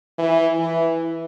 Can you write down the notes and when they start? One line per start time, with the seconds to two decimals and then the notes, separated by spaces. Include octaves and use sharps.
0.18 E3
0.60 E3